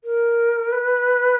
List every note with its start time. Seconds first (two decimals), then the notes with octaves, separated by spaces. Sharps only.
0.04 A#4
0.72 B4